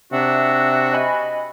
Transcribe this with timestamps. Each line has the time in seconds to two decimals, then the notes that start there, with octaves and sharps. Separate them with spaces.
0.12 C3 D4 F#4 E5 F#5
0.93 D#5 G#5 B5